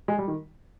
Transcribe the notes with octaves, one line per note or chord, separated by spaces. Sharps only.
G#3
G3
D#3